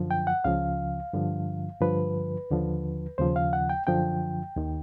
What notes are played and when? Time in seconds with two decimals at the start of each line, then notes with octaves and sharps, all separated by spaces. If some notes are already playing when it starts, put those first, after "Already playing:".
Already playing: F#2 D3 F3
0.11 G5
0.27 F#5
0.44 C#2 C#3 F3 F5
1.13 G2 D3 F3
1.81 G2 D3 F3 B4
2.51 D#2 D3 F3
3.18 D#2 C#3 F3 C5
3.36 F5
3.53 F#5
3.70 G5
3.87 F#2 D3 F3 G5
4.56 D#2 D#3